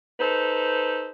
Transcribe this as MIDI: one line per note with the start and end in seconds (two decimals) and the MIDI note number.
0.19 1.11 63
0.19 1.11 69
0.19 1.11 71
0.19 1.11 72